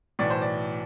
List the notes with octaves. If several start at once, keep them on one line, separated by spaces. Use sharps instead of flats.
B1 A2 E3 D5
C5
D5